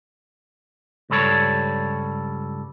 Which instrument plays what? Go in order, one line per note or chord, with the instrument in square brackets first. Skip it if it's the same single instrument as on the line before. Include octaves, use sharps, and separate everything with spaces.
[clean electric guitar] C#2 G2 G3 A4 C#5